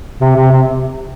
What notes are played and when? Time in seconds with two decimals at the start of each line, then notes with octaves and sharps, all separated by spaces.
0.20 C3
0.35 C3
0.51 C3